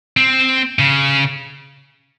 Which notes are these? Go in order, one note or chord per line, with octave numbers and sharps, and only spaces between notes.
C4
C#3